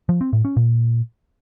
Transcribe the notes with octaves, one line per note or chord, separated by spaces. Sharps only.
F3
C4
A2
C#4
A#2